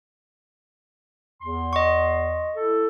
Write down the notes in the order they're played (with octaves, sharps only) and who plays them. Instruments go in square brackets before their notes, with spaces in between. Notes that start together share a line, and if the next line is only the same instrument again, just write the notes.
[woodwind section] E2 C6
[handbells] D#5 C#6
[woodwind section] E4 A4